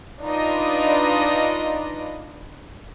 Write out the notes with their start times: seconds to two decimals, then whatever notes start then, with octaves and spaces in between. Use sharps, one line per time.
0.22 D4 D#4 F4 B4 D5 D#5